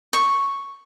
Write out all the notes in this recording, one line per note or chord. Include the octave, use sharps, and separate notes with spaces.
C#6